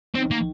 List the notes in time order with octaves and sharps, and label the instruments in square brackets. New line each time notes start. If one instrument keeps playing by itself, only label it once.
[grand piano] D#3 [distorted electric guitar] C4
[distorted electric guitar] A#3